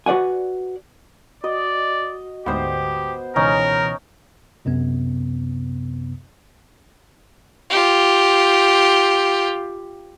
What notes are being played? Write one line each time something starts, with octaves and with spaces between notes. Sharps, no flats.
F#4 B4 D5 F#5 G#5
F#4 D5 D#5
D2 G#2 B3 G4 C5
C#2 B2 E3 C#4 D#4 A#4
B1 F#2 C3 B3
F4 G4